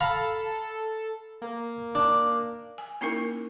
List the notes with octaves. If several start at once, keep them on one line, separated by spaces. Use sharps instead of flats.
A4 F5 A#5 B5
A#3
D4
G#5
A#3 C#4 D#4 E4 A#4